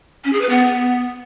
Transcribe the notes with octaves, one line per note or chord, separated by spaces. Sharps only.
C#4
G#4
B4
B3